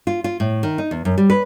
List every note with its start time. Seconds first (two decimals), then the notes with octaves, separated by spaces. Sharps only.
0.07 F4
0.24 F4
0.40 A2
0.63 D#3
0.78 D#4
0.91 E2
1.05 F#2
1.18 G3
1.30 B4